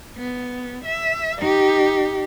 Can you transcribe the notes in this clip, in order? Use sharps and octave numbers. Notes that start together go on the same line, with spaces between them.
B3
E5
D#4 G4